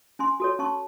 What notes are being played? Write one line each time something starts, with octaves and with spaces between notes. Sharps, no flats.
C#4 G#5 C6
F#4 A4 C#5
C#4 A5 C#6